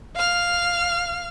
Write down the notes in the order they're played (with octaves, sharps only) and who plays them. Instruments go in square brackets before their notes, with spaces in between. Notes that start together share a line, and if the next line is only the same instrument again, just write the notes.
[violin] F5 F6